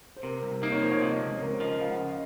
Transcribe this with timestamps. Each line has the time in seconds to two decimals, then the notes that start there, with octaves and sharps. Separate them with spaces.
0.16 C5
0.23 C3 A#4
0.43 C2
0.62 A#3 D#4
0.72 C#5
0.82 F3 C5
0.91 C#5
1.02 C3 D#5
1.21 C#2
1.41 C#2 A#4
1.51 C5
1.60 F3 D#5
1.71 D#5
1.80 C#3 F5
1.90 F#5
2.00 F5
2.10 D#5